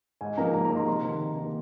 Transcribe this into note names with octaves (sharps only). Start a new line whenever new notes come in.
G#2 G#5
F3 A#3 D#4 A#5
G#2 A#5
A#5
F3 A#3 D#4
C6
C3 C6
D#3 A#3 A#5
C3
D#3 A#3